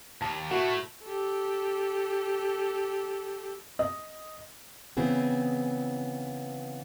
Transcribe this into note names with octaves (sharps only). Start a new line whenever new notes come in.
D#2 A5
A3 E4 F#4
G4 A4
D#5
C#3 E3 B3 C4 G#4